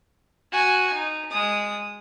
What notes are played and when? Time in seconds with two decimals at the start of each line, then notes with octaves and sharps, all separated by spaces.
0.52 F#4 G#5
0.93 D#4
1.31 G#3 D#6